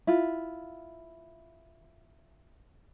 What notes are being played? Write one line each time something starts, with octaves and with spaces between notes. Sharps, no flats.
E4 F4